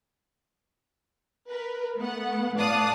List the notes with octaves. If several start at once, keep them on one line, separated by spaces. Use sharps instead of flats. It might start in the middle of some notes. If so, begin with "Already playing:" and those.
A#4 B4
A3 B3 F#5
A2 D5 F5 A5 D#6 F#6